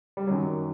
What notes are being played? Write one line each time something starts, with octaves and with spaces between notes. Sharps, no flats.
G3
F#2 D#3 F#3